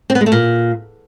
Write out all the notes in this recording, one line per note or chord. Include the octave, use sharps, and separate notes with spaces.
C4
B3
G#3
A3
A#2